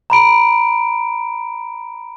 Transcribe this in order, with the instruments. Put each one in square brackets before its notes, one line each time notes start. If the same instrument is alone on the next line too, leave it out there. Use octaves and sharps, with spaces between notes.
[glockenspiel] A#5 B5 D7